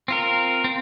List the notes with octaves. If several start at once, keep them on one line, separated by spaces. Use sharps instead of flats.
C4 F4 A#4
C4